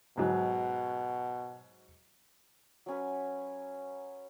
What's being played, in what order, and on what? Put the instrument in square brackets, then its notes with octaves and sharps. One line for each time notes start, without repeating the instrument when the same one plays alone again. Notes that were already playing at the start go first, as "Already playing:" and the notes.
[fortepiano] G#2 F#3 [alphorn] B2
[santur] F#3 C#4 B4